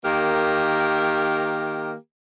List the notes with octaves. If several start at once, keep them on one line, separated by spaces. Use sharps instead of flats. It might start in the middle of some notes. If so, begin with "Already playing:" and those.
D#3 A#3 G4 A#4